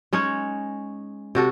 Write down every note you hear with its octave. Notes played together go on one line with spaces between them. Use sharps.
G#3 C#4 D#4 C#5
C3 F#4 A4